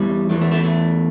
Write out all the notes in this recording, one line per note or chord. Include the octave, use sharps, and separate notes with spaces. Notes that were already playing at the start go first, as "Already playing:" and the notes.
Already playing: E2 E3 G3
E2 E3 A3
A3
A3
A3